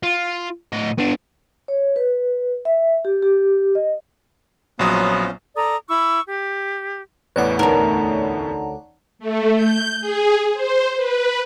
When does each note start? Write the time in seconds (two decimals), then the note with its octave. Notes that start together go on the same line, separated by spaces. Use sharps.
0.03 F4
0.72 A2 D#5
0.98 B3 D4
1.68 C#5
1.96 B4
2.65 E5
3.05 G4
3.22 G4
3.75 D#5
4.79 A#1 F#3 B3 C#4 F4 C5 D#6
5.56 A4 D5 A#5 D#6
5.89 E4 B5 C#6 E6
6.26 G4
7.36 A1 E2 A2 B4 C#5 D5 F#5
7.59 D2 D#4 A#4 A5 A#5
9.19 A3
9.55 G6
10.00 G#4
10.54 C5
10.96 B4